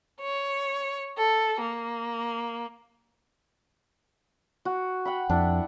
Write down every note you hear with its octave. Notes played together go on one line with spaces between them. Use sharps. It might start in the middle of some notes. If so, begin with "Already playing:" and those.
C#5
A4
A#3
F#4
F#5 G5 B5
F2 D4 E4